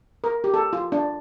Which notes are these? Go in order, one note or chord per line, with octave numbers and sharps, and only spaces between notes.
A#4
G4
A4
F4
D4